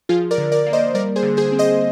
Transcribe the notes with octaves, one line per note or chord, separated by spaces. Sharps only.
F3 F4 G#4
A#4 D5
D3
A#4 D5
A#3
C5 D#5
G3 A#4 D5
G#4 C5
D3
G#4 C5
C4
C5 D#5